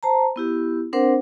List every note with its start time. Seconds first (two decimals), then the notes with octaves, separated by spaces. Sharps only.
0.03 C5 A5 A#5
0.36 B3 E4 G4
0.93 C4 D4 A#4 C5 F#5